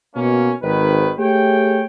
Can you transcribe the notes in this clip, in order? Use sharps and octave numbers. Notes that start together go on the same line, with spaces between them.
B2 A#3 C#4
G#1 D#3 B4
A3 G4 G#4 C#5 G5